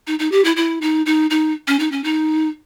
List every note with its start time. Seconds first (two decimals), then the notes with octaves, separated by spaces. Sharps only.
0.07 D#4
0.19 D#4
0.32 G4
0.45 E4
0.56 E4
0.81 D#4
1.06 D#4
1.30 D#4
1.67 C#4
1.79 D#4
1.92 C#4
2.04 D#4